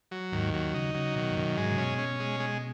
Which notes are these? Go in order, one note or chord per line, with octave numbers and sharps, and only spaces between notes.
F#3
D#2 G#2
F#3
C#3 D#4
C#3 F#3
B2 D#3
G#2
F#2 B2
G#2 G#3
C#3
B2 C#4
C#4
G#3
G#3